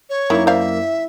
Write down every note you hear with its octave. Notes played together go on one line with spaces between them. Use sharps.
C#5
F#2 D#3 A#3 E4
C5 D5 E5 F5